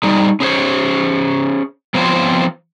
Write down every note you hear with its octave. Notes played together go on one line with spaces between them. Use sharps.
G3 D#4 G#4
C#4 G#4 C5 C#5
F3 B3 C4 F4 C5 C#5